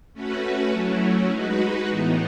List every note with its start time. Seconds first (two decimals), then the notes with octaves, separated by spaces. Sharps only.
0.14 A3 C#4 F#4 B4
0.72 F#3 A3 C#4 E4
1.31 G#3 D#4 F#4 B4
1.89 A2 E3 B3 D#4